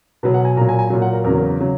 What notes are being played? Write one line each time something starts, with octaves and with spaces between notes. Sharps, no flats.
B2 F#3 B4
F#5
G#5
A#2 F#3 A#5
G#5
G#5
A#2 F#3
F#5
A#4
E2 C#3 F#3 A#4
C#3 F#3